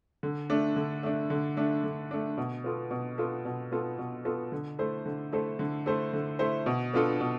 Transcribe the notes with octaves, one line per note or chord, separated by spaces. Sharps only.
D3
A3 D4
D3
A3 D4
D3
A3 D4
D3
A3 D4
B2
B3 F4 A4
B2
B3 F4 A4
B2
B3 F4 A4
B2
B3 F4 A4
D3
A3 E4 A4 C5
D3
A3 E4 A4 C5
D3
A3 E4 A4 C5
D3
A3 E4 A4 C5
B2
B3 D4 F4 A4
B2